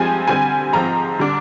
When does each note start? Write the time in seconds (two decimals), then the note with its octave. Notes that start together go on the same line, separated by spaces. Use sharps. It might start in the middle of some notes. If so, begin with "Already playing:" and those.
Already playing: G2 F3 G#3 C4 G#5
0.28 D3 G3 C4 G#5
0.73 G#2 F3 C4 A#5
1.19 D3 G3 D4